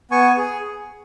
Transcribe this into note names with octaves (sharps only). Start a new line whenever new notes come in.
B3 G#5 C#6
G#4